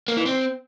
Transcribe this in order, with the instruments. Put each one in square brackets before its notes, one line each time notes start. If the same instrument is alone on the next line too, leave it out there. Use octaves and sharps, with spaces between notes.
[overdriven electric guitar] A#3
E3
C4